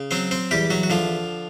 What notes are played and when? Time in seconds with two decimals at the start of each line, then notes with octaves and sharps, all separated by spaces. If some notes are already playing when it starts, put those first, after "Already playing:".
Already playing: C#3
0.11 F#3 C4 C5
0.31 C4 C5
0.51 E2 G3 G4
0.70 F#3 F#4
0.83 F#4
0.90 D3 F3 F4